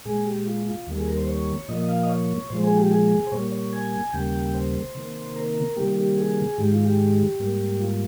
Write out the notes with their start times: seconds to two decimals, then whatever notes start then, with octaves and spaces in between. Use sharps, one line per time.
0.05 A#2 G#3 G#4
0.26 G4
0.46 F4
0.67 F4
0.87 D#2 D#3 G3 A#3
0.97 G#4
1.07 A#4
1.17 C5
1.28 C#5
1.68 A#2 F3 A#3 D#5
1.81 D#5
1.89 F5
2.03 D#5
2.09 C#5
2.50 A#2 F3 G#3 C5
2.64 G#4
2.77 G4
2.91 G#4
3.27 C5
3.32 A#2 G3 A#3 C#5
3.52 C#5
3.73 G#5
4.13 D#2 C#3 G3 A#3 G5
4.54 C5
4.95 C3 D#3 A#3
5.36 A#4
5.76 C3 D#3 G3 A#3 G4
5.97 G4
6.17 G#4
6.58 G#2 D#3 G#3 G4
6.72 F4
6.85 G4
7.40 G#2 G3 A#3
7.80 F4